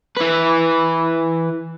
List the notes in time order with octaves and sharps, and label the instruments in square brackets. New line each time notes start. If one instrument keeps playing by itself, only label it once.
[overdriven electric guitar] E3 B4